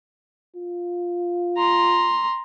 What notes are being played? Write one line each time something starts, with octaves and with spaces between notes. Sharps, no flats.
F4
A#5 C6